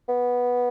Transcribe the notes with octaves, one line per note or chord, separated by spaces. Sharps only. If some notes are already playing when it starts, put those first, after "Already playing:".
B3